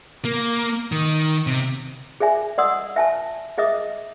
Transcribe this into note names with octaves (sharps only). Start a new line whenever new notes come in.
A#3
D#3
C3
G#4 D5 E5 G#5
D5 D#5 F#5 C6 D#6 E6
E5 G#5 A5
G#4 D#5 E5 D6 D#6